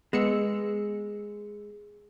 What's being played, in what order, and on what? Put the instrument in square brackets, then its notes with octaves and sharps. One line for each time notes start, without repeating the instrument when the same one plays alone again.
[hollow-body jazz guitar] G#3 [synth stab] B3 E6 C#7